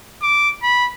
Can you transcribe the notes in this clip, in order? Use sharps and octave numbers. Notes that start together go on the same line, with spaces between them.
D6
B5